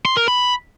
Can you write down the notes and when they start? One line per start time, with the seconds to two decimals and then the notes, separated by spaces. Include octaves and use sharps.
0.05 C6
0.17 A#4
0.28 B5